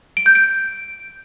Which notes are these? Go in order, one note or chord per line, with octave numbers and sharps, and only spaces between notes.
D7
G6
D7